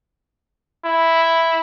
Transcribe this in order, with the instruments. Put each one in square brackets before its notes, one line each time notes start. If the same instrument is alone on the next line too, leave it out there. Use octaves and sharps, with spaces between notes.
[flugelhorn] E4